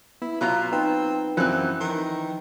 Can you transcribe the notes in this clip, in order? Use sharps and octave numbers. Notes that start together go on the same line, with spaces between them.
B3 E4
B2 F#3 F4 A#5
C4 D#4 B4
F#2 E3 F3 C4 F#6
D#3